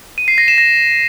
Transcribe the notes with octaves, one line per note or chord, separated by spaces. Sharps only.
D#7
C7
A#6
E7
A#6